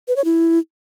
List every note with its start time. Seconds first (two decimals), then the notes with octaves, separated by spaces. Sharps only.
0.08 B4
0.16 C#5
0.25 E4